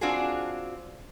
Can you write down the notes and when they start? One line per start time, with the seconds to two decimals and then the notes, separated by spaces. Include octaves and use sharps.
0.01 C4 D4 F4 F#4 G#4